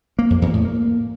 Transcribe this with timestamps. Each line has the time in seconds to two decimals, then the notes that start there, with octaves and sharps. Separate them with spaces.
0.19 A#3
0.30 F2
0.42 E2
0.53 A2
0.65 A#3